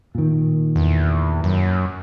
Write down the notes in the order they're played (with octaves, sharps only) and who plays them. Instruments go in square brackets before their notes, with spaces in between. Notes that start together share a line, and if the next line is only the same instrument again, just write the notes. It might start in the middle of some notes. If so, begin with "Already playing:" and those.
[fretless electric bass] A#2 D#3
[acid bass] E2
F#2